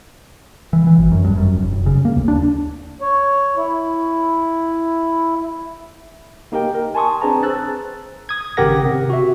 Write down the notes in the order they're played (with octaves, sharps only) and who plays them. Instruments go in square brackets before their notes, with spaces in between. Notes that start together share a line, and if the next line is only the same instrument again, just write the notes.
[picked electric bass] E3
E3
G#1
F#2
G2
F#2
F1
F#1
C#3
A#3
D#2
D4
[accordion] C#5
E4
[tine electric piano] A#3 D#4 G4 A#4 D#5 G5
A#4
G#5 A5 C6 C#6 D#6
C4 D4 G#4 B4 A5 A#5
C5 E6 F#6 A6
D#6 G#6
G#1 C#3 G4 A#4 F#5 A#6
C3
F#4 E5